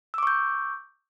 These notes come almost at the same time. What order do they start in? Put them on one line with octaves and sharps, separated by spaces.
E6 D6 C#6 G6